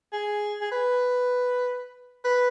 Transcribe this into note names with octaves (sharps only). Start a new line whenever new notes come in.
G#4
G#4
B4
B4